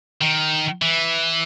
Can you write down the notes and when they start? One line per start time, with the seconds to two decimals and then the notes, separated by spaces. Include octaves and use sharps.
0.22 D#3
0.82 E3